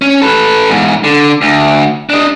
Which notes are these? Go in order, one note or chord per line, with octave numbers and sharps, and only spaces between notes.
C#4
A4 B4
E2 G#2
D3
D2
D4 D#5